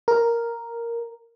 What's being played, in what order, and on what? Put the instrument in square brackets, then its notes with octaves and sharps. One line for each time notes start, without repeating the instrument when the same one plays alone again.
[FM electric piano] A#4